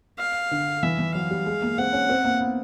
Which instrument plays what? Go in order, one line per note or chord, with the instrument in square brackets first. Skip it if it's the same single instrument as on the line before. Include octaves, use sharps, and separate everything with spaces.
[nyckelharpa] F5
[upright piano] D3
[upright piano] E3 [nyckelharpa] E5
[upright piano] E3
[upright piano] F#3 [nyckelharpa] F5
[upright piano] G3
G#3
A#3
[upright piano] C4 [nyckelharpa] F#5
[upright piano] C#4
C4
A#3
B3